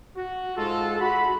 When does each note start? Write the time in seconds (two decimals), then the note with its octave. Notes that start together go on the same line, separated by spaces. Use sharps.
0.16 F#4
0.56 G#2 G#3 F4 A4
0.99 F#4 B5